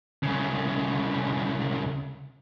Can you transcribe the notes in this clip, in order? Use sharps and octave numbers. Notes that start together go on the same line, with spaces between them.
C2 C#3